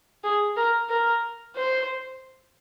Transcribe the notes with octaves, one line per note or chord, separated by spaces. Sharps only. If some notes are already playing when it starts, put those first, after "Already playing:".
G#4
A#4
A#4
C5